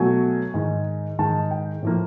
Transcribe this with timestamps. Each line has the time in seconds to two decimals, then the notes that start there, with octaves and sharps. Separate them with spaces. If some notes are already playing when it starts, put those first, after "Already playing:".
Already playing: B2 F#3 A3 G#5
0.54 G#2 D#3 G#3
1.19 G#2 D#3 G#3 A5
1.51 G5
1.83 A2 F3 A#3